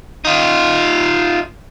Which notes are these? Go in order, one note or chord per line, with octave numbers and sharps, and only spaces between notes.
D#4 F4